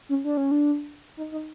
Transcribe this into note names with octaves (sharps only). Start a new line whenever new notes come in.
C#4
D4
C#4
D4
D#4
D#4